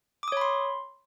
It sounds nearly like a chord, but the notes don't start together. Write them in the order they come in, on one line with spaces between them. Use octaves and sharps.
D6 D#6 C#5 B5 C6